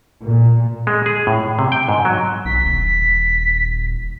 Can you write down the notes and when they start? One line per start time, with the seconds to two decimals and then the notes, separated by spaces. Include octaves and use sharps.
0.23 A#2
0.87 G#3
1.06 G#4
1.27 A2
1.59 C3
1.72 G5
1.89 G#2
2.05 F#3
2.45 B1 B6
2.63 D#1